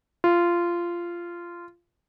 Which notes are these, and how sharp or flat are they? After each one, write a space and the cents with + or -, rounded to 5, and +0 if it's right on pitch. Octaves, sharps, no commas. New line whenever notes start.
F4 -15